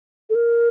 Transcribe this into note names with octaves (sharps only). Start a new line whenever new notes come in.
A4
A#4